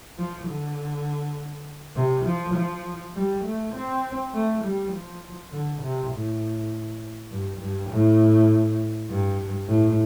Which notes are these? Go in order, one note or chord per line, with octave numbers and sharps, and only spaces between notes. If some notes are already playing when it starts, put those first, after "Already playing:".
F3
D3
C3
F3
F3
G3
A3
C4
A3
G3
F3
D3
C3
A2
G2
G2
A2
G2
A2